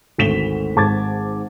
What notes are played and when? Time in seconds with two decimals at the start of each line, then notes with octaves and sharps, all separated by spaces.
0.18 G#1 D2 B6 E7 F7 G7
0.76 G#1 G#2 A5 D6 G#6 A6